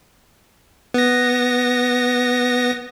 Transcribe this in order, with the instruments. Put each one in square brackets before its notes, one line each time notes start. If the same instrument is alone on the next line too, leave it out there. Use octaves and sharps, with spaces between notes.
[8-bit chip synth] B3 A#6